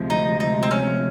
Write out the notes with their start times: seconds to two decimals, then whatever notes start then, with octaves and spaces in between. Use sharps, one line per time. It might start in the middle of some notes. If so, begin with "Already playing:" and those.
Already playing: D2 C3 F3 G#3
0.10 D#4
0.40 D#4
0.63 C4
0.71 C#4